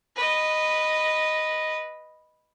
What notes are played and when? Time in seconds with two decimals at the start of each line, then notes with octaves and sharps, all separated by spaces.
0.16 B4 D#5